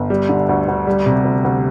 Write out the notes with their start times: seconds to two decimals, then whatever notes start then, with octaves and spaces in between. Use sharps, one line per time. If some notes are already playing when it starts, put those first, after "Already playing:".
Already playing: G1
0.10 G3
0.29 D3
0.49 D2
0.68 D2
0.87 G3
1.06 C3
1.25 D2
1.44 D2